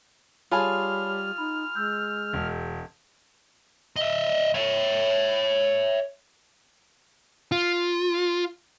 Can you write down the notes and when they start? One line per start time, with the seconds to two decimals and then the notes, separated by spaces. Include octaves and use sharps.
0.51 G3 F4 G#4 C#5 G#5 A5 B5 F6
1.38 D#4 B5
1.75 G#3 E6 G6
2.33 E1
3.96 D#5 E5
4.54 C#5 E5
7.52 F4